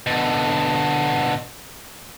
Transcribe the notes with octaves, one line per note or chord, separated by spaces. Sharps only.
B2 D3